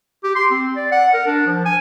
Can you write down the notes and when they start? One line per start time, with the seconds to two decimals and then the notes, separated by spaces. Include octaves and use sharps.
0.24 G4
0.36 C6
0.51 C4
0.76 D5
0.92 F#5
1.14 A#4
1.27 D4
1.47 F3
1.66 G#5